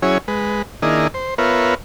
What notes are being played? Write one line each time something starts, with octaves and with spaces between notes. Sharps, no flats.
F#3 C#4 E4 G#4 C#5
G#3 B4
D#3 A#3 D4 E4 G#4 D#5
C5
B3 F4 A#4 B4 C#5 E5